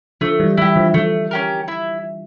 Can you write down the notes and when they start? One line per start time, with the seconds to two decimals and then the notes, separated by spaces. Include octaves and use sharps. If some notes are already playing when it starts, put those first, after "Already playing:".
0.21 D3 F3 A3
0.40 E3 G3
0.57 E3 G3 E4 G4
0.76 D3 F3
0.94 D3 F3 A3
1.31 C#4 G4 A#4
1.68 E4